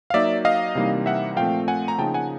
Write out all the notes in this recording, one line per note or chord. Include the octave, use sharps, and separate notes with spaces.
F5
F#3 A#3 D#4 D5 E5
D#5 F5
C3 E3 G3 A#3 D#4
E5 F#5
A#2 F3 A3 C4 F5 G5
F#5 G#5
A#5
C#3 F3 A#3 D#4 G5 A5
F#5 G#5